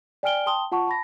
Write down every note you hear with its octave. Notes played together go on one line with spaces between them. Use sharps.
D5 G5 G#5 F6 D7 G7
G5 A5 C6 D#6 G7
F4 F#5 A5 C#6
A5 B5 A#6